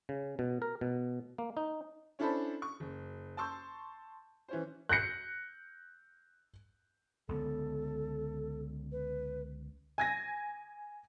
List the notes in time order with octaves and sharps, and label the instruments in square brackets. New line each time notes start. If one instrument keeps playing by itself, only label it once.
[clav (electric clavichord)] C#3
B2
A#4
B2
A#3
D#4
[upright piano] C#4 D4 E4 A4 C5 B5
C#6
F#1
A5 C6 C#6 E6 G6
E3 C#4 C5
F#6 G6 A#6 C#7
[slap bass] C#2 D3 B3 [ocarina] A4
[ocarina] B4
[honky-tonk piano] G#5 G#6 A#6